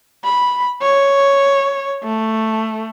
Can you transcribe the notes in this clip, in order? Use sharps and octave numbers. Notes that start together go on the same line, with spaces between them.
B5
C#5
A3